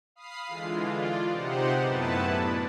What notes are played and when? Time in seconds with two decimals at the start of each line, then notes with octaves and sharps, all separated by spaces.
0.16 F5 B5 D#6 C7
0.47 D3 E3 G#3 F4
0.92 F4 D5
1.28 C3 D#4 G4 C5 F#5
1.79 F#2 A2 B3 E4 B4 A5
2.32 D4